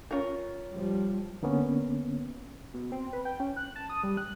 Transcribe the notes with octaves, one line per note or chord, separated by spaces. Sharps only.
C#4 F4 A#4
F3 G3
D3 A#3 B3 C#4
B2
C4
B4
G5
C#4
F#6
A5
D#6
G3
F#6